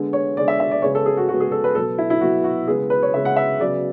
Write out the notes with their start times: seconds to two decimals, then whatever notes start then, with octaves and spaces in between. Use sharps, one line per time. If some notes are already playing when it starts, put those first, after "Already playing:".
Already playing: D3 G#3 B3
0.13 C#5
0.37 D3 G#3 B3 D5
0.48 E5
0.60 E5
0.71 D5
0.82 C#3 G#3 B3 C#5
0.95 A4
1.06 G#4
1.17 F#4
1.29 C#3 G#3 B3 F#4
1.40 G#4
1.52 A4
1.64 B4
1.75 B2 F#3 B3 A4
1.98 E4
2.10 E4
2.21 B2 F#3 B3 F#4
2.44 F#4
2.68 C#3 G#3 B3 G#4
2.90 B4
3.03 C#5
3.14 C#3 G#3 B3 E5
3.25 F#5
3.36 E5
3.60 C#3 F#3 B3 D5